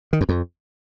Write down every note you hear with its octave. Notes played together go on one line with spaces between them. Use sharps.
D#3
F#2
F2